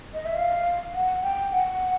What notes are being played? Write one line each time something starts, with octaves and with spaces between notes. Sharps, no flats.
D#5
E5
F5
F#5
G5
F#5